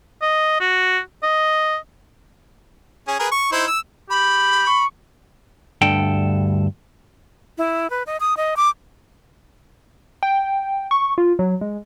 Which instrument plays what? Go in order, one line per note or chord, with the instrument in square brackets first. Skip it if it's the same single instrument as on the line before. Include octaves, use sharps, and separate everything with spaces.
[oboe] D#5
F#4
D#5
[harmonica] C#4 G#4
G#4 A#4 B4
C#6
D#4 E4 C5
E6
[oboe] G4 [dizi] B5
[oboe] C#6
[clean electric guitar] D2 G2 A4 G5
[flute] E4
B4
D#5
D#6
D#5
D6
[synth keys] G5
C#6
F4
F#3
G#3